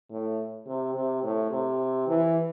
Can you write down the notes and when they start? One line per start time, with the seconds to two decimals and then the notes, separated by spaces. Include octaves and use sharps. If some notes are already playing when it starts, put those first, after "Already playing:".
0.11 A2
0.67 C3
0.95 C3
1.23 A2
1.51 C3
2.08 E3